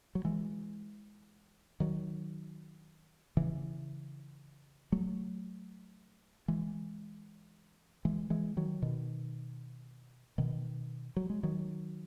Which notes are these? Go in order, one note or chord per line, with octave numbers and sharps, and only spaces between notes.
F#3
E3 G#3
D#3 F#3
C#3 E3
F#3 A3
E3 G#3
E3 G#3
E3 G#3
D#3 F#3
B2 D#3
B2 D#3
F#3
G#3
D#3 F#3